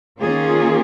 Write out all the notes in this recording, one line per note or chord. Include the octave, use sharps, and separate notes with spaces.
D#3 A#3 C#4 F4 G#4